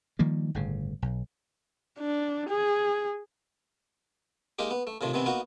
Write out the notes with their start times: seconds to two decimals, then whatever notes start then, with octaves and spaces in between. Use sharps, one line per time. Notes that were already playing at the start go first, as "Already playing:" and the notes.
0.19 D#3 F3 G3 A#3
0.55 G1 A2 C#3
1.02 B1
1.99 D4
2.49 G#4
4.59 G#3 A#3 D#4 G4
4.71 B3
4.87 A3
5.01 A2 C3 D#3 F3
5.13 C3 D#3 E3 B3 C4
5.26 A#3 B3 D#4 F#4